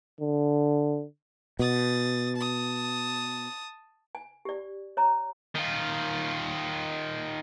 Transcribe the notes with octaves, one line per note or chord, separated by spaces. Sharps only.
D3
B2 D#6 A6
A5 D#6
G#5
G4 D5
C#5 A#5
D#3 F4